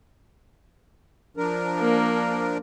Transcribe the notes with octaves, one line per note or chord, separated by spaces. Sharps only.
F3 D4 A#4
A#3